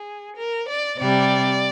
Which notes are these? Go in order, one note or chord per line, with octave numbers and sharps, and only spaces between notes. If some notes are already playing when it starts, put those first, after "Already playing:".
Already playing: G#4
A#4
D5
C3 G3 D5